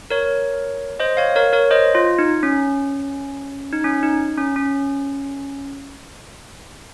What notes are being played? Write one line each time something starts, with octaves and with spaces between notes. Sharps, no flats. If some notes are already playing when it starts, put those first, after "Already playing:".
A#4 C#5
C5 D#5
C#5 F5
A#4 C#5
A#4 C#5
C5 D#5
F4
D#4
C#4
D#4
C#4
D#4
C#4
C#4